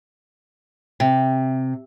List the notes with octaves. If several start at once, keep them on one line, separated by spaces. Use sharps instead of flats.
C3